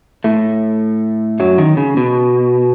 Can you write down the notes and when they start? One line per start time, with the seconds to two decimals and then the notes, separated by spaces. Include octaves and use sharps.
0.24 A2 A3
1.40 F#2 F#3
1.58 D#3
1.77 C#3
1.97 B2